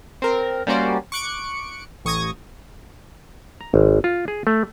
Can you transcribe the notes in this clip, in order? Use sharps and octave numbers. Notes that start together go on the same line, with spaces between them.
C4 A#4
G3 A#3 C#4 F#4 C5 D5
C#6 D6 F#6 C#7 D7
A1 C#6 D#6 G#6 A#6
A#5
G#1
F4
G#4
A3